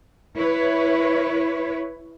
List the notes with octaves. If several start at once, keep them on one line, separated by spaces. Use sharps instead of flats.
E4 B4 C#5